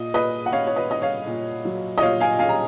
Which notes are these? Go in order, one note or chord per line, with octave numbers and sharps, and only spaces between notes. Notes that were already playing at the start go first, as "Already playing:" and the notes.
Already playing: A#2 D#5
A#2 B4 D#5
F#5
C#4 C#5 F5
C#5
B4 D#5
C#4 D#5
C#5 F5
A#2
F#3
D#5
A#2 C#5 F5
F5 G#5
C#4 F5 G#5
A#5